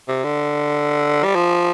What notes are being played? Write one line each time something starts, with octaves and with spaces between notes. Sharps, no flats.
C3
D3
G3
F3